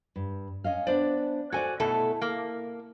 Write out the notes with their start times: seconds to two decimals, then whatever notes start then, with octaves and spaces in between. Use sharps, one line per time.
0.16 G2
0.64 C#4 D#5 F5
0.87 B3 D4 C5 D5
1.52 F#4 A4 C5 D5 G#5
1.80 B2 A3 E4 A4
2.22 A#3